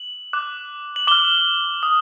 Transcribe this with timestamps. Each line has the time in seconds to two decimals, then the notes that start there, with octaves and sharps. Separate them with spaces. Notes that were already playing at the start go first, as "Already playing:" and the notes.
Already playing: F#7
0.33 D6 F#6
0.96 F#7
1.07 D6 F6 G7
1.83 D#6